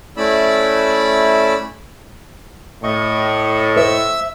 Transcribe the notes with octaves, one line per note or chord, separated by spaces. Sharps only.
A3 C#4 E4 D5 B5 E6
A2 D#5 C#6
C5 E5 E6